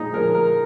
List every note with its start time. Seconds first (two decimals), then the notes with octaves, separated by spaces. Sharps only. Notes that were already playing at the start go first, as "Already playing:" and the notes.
Already playing: A#2 F3 G#3 D#4
0.14 A#2 F3 G#3 A#4
0.35 A#4